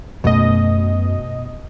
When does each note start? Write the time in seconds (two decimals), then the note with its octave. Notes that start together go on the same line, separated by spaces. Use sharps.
0.24 F#2 B2 A3 D#5